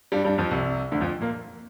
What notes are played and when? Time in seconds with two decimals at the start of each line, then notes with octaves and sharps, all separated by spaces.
0.12 G2 G3
0.25 G2 G3
0.38 F2 F3
0.51 C2 C3
0.92 D2 D3
1.01 F2 F3
1.20 A#2 A#3